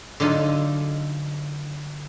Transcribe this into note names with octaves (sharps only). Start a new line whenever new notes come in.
D3 F#3 D#4 F4 A4